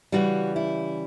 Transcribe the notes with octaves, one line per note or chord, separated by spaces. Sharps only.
C#3 E3 G3 F#4
E4